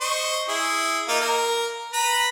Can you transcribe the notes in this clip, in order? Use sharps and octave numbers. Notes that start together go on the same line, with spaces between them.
C5 D#5 C#6
E4 G#4
A#3 D#4 F4
A#4
B4 A#5 B5